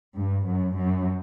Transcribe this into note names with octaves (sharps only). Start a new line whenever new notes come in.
G2
F#2
F#2